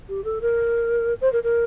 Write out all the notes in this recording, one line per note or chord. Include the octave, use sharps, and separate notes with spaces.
G4
A4
A#4
C5
A#4
A#4